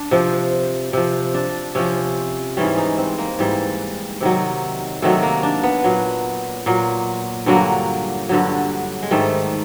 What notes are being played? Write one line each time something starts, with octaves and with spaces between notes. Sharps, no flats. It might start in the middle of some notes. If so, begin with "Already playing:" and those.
Already playing: D4
C3 F3
C3 F3
D4
C3 F3 C#4
G#2 E3 G3 C#4
D#4
C4
A#3
G#2 E3 G3
C3 D#3 F#3
C3 D#3 F#3 A3
A#3
D4
B3
A#2 F#3
A#2 F#3
G2 D3 F#3 A#3
G2 D3 F#3
G#3
G#2 D#3 G3 A3